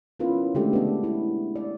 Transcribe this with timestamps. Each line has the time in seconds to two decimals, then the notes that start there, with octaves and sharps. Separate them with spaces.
0.20 B3 C#4 E4 F4 A#4 B4
0.55 D3 G#3 A3 D4 G4
0.73 B3 D4
1.04 E4
1.56 D5